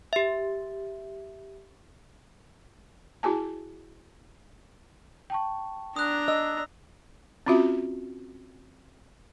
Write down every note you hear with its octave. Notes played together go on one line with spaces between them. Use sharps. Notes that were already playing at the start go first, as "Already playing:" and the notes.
G4 E5
E4 F#4 G#4 G#5 A5
G5 A5 C#6
D4 A#5 D#6 F#6
D#5 E6
C4 C#4 F4 F#4 E5